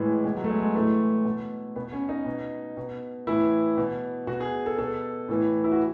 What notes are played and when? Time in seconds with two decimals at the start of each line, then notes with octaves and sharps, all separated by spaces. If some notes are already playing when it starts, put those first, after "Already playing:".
Already playing: A2 E3 G#3
0.24 B2 G#3
0.36 F#3
0.44 A3
0.49 G#3
0.62 G#3
0.75 A2 E3 A3
1.25 B2
1.76 B2 B3
1.92 C#4
2.09 D#4
2.26 B2
2.77 B2
3.27 A2 E3 E4
3.78 B2
4.27 B2 F#4
4.40 G#4
4.66 A4
4.78 B2 A4
5.29 A2 E3
5.64 E4
5.72 F#4